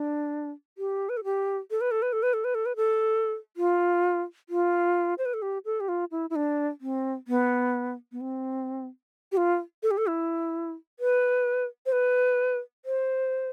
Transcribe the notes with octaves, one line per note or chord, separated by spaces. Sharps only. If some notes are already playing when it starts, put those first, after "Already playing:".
Already playing: D4
G4
B4
A4
G4
A4
B4
A4
B4
A4
B4
A4
B4
A4
B4
A4
F4
F4
C5
B4
A4
G4
A4
G4
F4
E4
E4
D4
C4
B3
B3
C4
G4
F4
A4
G4
A4
E4
B4
C5
B4
C5